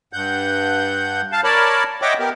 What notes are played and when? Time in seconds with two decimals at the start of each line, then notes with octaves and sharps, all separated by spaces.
0.13 G2 F#5 G6
1.32 F5 A5
1.44 A#4 C#5 D5 A5 B5
2.02 C#5 D#5 E5 F#5 G5 D6
2.19 B3 G4 A#4